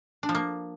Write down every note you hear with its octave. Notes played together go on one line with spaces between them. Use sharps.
D4
F3
A#3